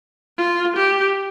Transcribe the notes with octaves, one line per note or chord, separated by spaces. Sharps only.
F4
G4